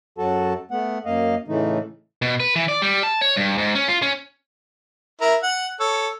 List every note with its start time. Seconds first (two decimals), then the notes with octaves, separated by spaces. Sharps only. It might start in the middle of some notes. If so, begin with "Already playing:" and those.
0.18 F#2 F#3 F#4 A4 A5
0.71 A3 B3 F#5
1.06 F#2 A#3 D#5 F5
1.48 A2 C#3 E3 A3 D#4
2.22 B2
2.40 B4
2.56 E3
2.68 D5
2.82 G3
3.03 A5
3.21 C#5
3.36 G2
3.58 G#2
3.75 C#4
3.88 F4
4.02 C#4
5.21 E4 A#4
5.43 F#5
5.80 A4 C#5